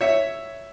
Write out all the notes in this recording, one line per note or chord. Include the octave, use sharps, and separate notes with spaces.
C#5 E5